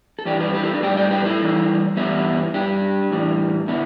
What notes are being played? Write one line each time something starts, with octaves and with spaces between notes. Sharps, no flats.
A4
G2 E3 G3 D4 G4
G4 B4
G4 B4
E4 A4
D4 G4
A2 G3 D5 G5
D5 G5
G4 B4
E4 A4
A2 E3 G3
G2 E3 G3 B3 E4
G2 G3 D4 G4
A2 E3 G3
D3 B3 E4